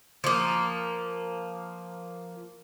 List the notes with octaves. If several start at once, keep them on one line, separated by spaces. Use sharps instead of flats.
F3 A#3